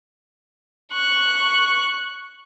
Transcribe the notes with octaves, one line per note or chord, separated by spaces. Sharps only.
C#6 F#6